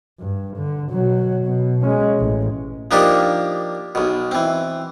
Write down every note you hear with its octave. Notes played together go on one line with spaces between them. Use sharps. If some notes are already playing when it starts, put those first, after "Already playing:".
G2
D3
B2 F#3
B2
G#3 C#4
A1
F3 A#3 D4 D#4 G4
B1 B2
E3 C4